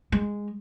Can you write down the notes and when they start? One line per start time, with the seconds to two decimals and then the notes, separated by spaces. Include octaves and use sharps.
0.12 G#3